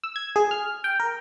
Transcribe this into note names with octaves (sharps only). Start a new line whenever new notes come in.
E6
G#6
G#4
F6
G5
A#4